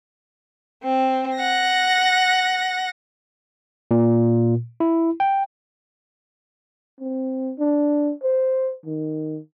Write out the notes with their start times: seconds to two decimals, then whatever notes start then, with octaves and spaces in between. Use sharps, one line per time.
0.83 C4
1.36 F#5 A#6
3.91 A#2
4.80 E4
5.20 G5
7.00 C4
7.59 D4
8.23 C5
8.85 D#3